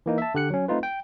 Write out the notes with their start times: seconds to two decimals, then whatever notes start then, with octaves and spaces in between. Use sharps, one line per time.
0.06 E3 A#3 D#4
0.18 E5 A5
0.34 D3 G4 F#6 C#7
0.50 F#3 C#4
0.68 A3 C4 D#4 F4 B4
0.83 G5